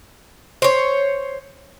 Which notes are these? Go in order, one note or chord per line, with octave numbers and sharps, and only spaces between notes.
C5 C#5